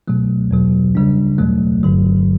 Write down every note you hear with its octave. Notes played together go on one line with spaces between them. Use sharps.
B2 F#3 A3
E2 B2 F#3
C#3 G3 D4
E2 B2 F#3 A3
G1 G2 D3 F#3